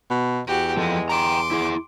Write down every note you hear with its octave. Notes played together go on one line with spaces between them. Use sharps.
B2
E2 F#4 G4
F3 G#3 A4
G5 A#5 C6 D6
E4 G#4